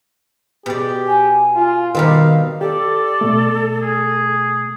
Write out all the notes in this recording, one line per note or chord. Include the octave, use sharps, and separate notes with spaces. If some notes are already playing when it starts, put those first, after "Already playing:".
B2 G4 G#4 D5
G#5
F4
B2 D#3 G3 C4 D#5 F5
G4 A4 D5
B2 A3
G#4